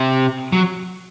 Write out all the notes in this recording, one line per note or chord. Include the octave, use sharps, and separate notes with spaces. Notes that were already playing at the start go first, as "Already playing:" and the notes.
Already playing: C3
F#3